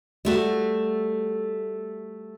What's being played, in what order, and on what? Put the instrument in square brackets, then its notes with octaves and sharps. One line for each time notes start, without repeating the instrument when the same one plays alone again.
[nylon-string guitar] G3 A3 F#4